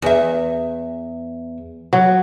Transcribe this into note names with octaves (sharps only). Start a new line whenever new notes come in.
E2 E5
F#3